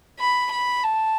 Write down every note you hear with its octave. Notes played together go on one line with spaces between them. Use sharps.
B5
B5
A5